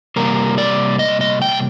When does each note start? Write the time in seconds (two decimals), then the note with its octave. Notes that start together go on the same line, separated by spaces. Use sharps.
0.16 C3 G3 A#3 A#4
0.58 D5
0.99 D#5
1.21 D#5
1.42 G5